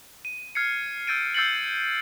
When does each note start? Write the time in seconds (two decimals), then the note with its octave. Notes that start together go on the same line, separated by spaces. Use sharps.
0.25 D#7
0.55 F6 G#6 C7 C#7
1.07 E6 G6 A6 D7 D#7
1.34 E6 G6 A6 C7 C#7 F#7